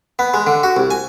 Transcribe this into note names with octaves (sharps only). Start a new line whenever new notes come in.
B3
G#3
D3
F#4
C2
G#5